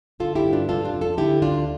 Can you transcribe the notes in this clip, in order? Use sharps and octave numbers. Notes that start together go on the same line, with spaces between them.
D3 F4 A4
E4 G4
G2
D4 F4
C3 F4 A4
D4 F4
F2
F4 A4
D3 E4 G4
D2 D4 F4